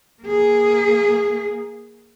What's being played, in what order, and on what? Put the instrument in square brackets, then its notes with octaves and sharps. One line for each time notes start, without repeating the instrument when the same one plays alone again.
[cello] A#3 G#4